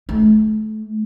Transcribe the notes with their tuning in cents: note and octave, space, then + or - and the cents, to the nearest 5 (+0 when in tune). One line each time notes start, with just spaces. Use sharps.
A3 -30